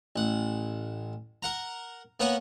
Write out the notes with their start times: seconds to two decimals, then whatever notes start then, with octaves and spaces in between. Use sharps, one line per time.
0.16 A1 F#5
1.43 A#4 F#5 A#5
2.20 A#3 B3 A#4 C#5 F#5 G#5